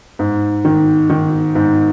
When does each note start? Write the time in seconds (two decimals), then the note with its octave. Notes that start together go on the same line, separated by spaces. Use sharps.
0.19 G#2
0.65 D#3
1.10 D#3
1.55 G#2